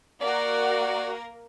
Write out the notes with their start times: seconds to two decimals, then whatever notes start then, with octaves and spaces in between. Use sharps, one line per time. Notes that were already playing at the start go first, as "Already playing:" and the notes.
0.21 A#3 F#4 A#4 D5